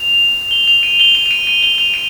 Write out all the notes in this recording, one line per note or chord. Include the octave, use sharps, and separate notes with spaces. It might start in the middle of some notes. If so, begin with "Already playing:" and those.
Already playing: F7
G7
F7
D#7
G7
F7
F7
D#7
D#7
G7
F7
D#7